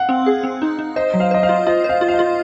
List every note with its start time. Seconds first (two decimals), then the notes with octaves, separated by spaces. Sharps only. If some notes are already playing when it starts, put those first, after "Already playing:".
Already playing: F5 F#5
0.09 C4
0.26 G#4
0.43 C4
0.62 D#4
0.79 D#4
0.96 C5 D#5
1.14 F#3
1.20 F5
1.31 C5 D#5
1.43 F5
1.49 F4
1.67 F4 D#5
1.84 C5
1.89 F5
2.01 F4
2.08 F5
2.14 D#5
2.19 F4